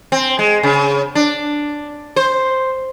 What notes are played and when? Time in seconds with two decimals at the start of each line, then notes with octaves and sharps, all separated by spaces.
0.12 C4
0.39 G#3
0.63 C#3
1.15 D4
2.16 C5